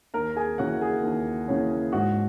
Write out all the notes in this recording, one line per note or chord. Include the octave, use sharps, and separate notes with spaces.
D#2 A#4 A#5
G#4 G#5
C#3 E3 A#3 C#4 F#4 F#5
G#4
D#2
C#3 E3 A#3 C#4
G#2 F#4